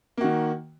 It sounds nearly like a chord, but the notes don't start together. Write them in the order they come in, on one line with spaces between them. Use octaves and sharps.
A#3 F#4 D#3